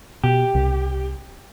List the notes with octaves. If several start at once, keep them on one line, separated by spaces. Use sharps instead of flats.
B2 G4
C2